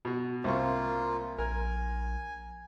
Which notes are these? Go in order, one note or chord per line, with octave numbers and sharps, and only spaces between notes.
B2 F#4
C2 A#3 C4 F4 C#6
A#1 A#4 G#5